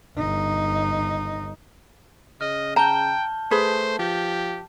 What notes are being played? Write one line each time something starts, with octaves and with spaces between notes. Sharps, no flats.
G1 D#4
C#3 D#5 F6
G5 A5 A#5 G6 G7
A3 G#4 B4 C5
F3 G4